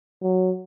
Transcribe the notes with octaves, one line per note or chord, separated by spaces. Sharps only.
F#3